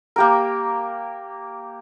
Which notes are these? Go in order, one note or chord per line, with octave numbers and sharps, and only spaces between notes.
A#3 G4 A#4